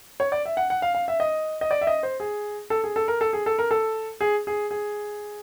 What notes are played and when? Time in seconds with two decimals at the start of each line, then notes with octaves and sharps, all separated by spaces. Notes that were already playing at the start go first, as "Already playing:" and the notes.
0.20 C#5
0.32 D5
0.45 E5
0.57 F#5
0.70 F#5
0.82 F5
0.95 F5
1.08 E5
1.20 D#5
1.61 D#5
1.71 D5
1.81 E5
1.87 D#5
2.03 C5
2.20 G#4
2.70 A4
2.84 G#4
2.96 A4
3.08 A#4
3.21 A4
3.33 G#4
3.46 A4
3.59 A#4
3.71 A4
4.21 G#4
4.47 G#4
4.71 G#4